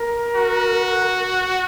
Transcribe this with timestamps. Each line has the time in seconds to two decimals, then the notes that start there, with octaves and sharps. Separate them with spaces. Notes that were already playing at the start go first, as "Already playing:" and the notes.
Already playing: A#4
0.36 F#4